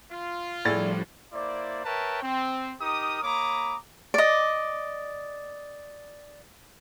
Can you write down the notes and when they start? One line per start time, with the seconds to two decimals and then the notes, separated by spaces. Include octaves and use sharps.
0.10 F4
0.65 A2 F3 G3 D4 E4 G#4 D5 A6
1.33 A#3 E4 C5 D5
1.85 A#4 B4 C#5 E5 G5 A5
2.23 C4
2.81 D#4 G4 A#4 D6 D#6
3.23 A#3 C#5 A#5 B5 D6 D#6
4.14 D5 D#5